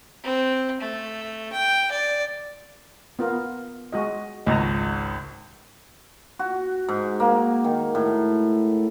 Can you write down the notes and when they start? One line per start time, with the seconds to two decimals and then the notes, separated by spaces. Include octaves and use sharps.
0.24 C4
0.81 A3
1.53 G5
1.92 D5
3.19 B3 F4 A#4
3.92 G#3 F#4 D#5
4.46 G#1 C#2 D#5 A5 A#5
6.39 F#4
6.89 G#2
7.20 A#3
7.64 D#3
7.95 A2